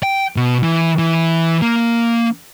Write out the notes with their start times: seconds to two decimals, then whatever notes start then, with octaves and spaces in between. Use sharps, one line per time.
0.03 G5
0.36 B2
0.63 E3
0.98 E3
1.62 A#3